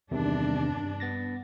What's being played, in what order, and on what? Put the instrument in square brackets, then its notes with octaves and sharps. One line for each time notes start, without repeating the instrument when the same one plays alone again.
[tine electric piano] E2 C3 D#3 [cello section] G2 D4
[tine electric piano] B3 A6 A#6